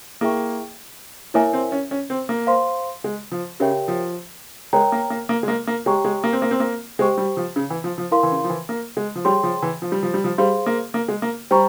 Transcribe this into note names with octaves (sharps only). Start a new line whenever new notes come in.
A#3 E4 G#4 E5 G5 C#6
A#3 E4 A#4 C#5 E5 G#5
C4
C#4
C#4
C4
A#3
C5 F5 C6
G#3
F3
C#3 G4 A#4 C#5 E5 G5
F3
G#3 A#4 C#5 G5 A#5
A#3
A#3
A#3
G#3
A#3
A#3
G#3 G4 C#5 G5 A#5 C#6
G#3
A#3
C4
A#3
C4
A#3
G#3 G4 C5 G5 C#6
G3
F3
C#3
E3
F3
F3
E4 A#4 F5 C6
E3
C#3
F3
E3
A#3
G#3
F3
G3 G#4 C#5 G5 C6
F3
E3
F3
G3
F3
G3
F3
G3 G#4 C5 F5 C6
A#3
A#3
G#3
A#3
G3 C5 G5 A#5 C#6